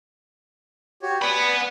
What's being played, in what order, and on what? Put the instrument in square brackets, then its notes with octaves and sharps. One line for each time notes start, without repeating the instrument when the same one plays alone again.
[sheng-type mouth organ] F#4 G4 C#5
[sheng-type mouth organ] B4 D5 G#5 [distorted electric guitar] F#5 B5